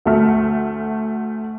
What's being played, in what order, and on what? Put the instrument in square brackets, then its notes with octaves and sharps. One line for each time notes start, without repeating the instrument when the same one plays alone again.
[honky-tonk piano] D2 A3 F6